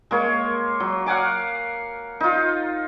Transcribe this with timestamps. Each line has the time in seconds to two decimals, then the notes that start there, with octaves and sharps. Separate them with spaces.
0.11 G#3 A#3 C#5
0.80 F#3
1.06 F5 F#5 G#5 D6
2.20 D#4 F4